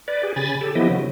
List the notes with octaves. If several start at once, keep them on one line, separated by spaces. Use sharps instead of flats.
B4 D5
G4 G#4
C#3 G#5 B5 A6
G4 A4
E3 F3 B3 E4 G4 D#5
C#3 F#3